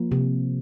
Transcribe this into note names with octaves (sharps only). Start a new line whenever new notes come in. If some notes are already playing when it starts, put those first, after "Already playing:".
Already playing: F3 A#3
C3